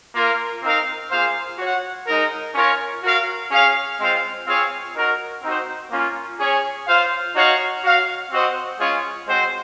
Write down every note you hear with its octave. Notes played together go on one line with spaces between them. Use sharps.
A#3 F4 A#4 F5
C4 D#4 A#4 F5
A#3 F4 G#4 C5 F5
F#4 C#5 F#5
G#3 D#4 A#4
C#4 F4 A#4 C#5
F#4 A#4 F5
C#4 G#4 C#5 F5
G#3 C4 F4 C5 F5
C4 F4 G#4 C#5 F5
D#4 F#4 A#4
C4 D#4 F#4 C5
A#3 C#4 F4
C#4 G#4 C#5
F4 C5 F5
D#4 F#4 C#5 F5
F#4 C#5 F5
C4 F#4 C5 D#5 F#5
G#3 C#4 F4 G#4 C#5
G#3 C4 F#4 C5